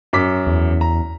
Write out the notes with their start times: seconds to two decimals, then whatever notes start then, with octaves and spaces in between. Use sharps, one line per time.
0.13 F#2 D6 B6
0.47 E2
0.81 A#5